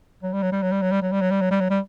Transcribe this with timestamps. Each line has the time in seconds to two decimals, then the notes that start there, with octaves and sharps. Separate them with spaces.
0.23 F#3
0.33 G3
0.42 F#3
0.52 G3
0.62 F#3
0.72 G3
0.82 F#3
0.92 G3
1.02 F#3
1.12 G3
1.21 F#3
1.31 G3
1.41 F#3
1.51 G3
1.61 F#3
1.70 G3